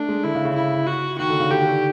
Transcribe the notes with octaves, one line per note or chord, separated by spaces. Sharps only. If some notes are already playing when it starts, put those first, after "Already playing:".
Already playing: A3 D4
G#3
D3 E4
C#3
C#3
E4
F#4
D#3 F#4
D3
C#3
D3 G4
D#3
D3